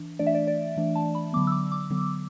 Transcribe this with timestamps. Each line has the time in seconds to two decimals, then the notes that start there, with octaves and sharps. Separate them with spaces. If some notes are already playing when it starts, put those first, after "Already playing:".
Already playing: E3 D4
0.19 E3 A3 D4 D5
0.27 E5
0.35 D5
0.47 D5
0.77 E3 A3 D4
0.95 A5
1.15 B5
1.33 D3 F#3 B3 D6
1.47 E6
1.52 D6
1.72 D6
1.90 D3 F#3 B3